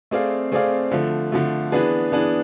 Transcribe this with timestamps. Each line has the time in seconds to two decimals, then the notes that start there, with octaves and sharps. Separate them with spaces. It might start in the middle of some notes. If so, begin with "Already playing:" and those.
0.11 A3 C4 G#4 D5 F5
0.52 A3 C4 G#4 D5 F5
0.91 D3 F3 A3
1.32 D3 F3 A3
1.72 E3 B3 D4 G#4 B4
2.12 E3 B3 D4 G#4 B4